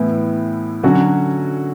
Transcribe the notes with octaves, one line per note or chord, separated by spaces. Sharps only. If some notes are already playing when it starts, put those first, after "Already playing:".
Already playing: A2 E3 B3 E4
D3 F#3 C#4 F#4